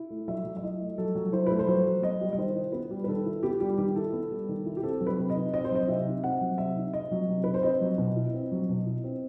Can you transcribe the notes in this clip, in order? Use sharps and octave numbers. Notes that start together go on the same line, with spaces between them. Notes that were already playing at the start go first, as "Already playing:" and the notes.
Already playing: E4
A3
F#3 E5
F#3
E5
E4 D#5
A3
F#3 A4
F#3
E4 C5
A3 B4
C5
F#3
F#3
B3 D#5
G3
D#5
D#3 C5
E4
B3 B4
G3
B4
D#3 A4
E4
B3 G4
G3 G4
D#3 G4
E4 A4
B3
G3
D#3
E4
G4
C4 A4
F#3
B4
C3
D#5
D#4
C4 D#5
C5
F#3 D#5
C3 E5
D#4
C4 F#5
F#3
C3 E5
D#4
C4 D#5
F#3
C3
D#4 B4
C5
C4 D#5
F#3
B2
E4
C4
F#3
B2
E4
C4